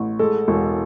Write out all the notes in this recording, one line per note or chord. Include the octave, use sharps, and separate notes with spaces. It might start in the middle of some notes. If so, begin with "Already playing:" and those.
Already playing: A1
G#3 A4
E1